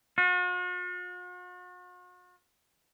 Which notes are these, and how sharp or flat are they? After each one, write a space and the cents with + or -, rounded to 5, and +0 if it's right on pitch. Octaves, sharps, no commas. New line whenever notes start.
F#4 -45